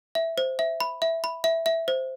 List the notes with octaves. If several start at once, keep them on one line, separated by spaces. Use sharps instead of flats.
E5
C5
E5
B5
E5
B5
E5
E5
C5